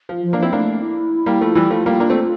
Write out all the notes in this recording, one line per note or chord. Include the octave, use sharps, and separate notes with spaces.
F3
F3
A#3 D4
F3 C4 E4
A3 A#3 D4
E4
G3 A#3
F3 A3
E3 G3
F3 A3 F4
G3 A#3
A#3 D4
A3 C4